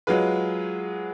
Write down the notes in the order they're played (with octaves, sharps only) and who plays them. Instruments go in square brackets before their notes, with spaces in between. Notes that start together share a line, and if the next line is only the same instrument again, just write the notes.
[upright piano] F#3 G#3 F4 G#4 B4